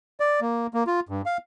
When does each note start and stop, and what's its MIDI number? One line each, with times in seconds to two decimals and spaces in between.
0.20 0.40 74
0.41 0.67 58
0.74 0.84 58
0.87 1.00 65
1.09 1.22 43
1.26 1.37 77